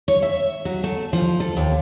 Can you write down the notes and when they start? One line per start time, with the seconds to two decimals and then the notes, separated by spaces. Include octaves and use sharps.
0.08 C#5
0.23 E5
0.65 F#3
0.84 A3
1.13 F3
1.40 A4
1.57 D#2